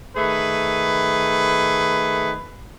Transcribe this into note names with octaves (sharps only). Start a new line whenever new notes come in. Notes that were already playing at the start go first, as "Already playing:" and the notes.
D#3 A3 G#4 B4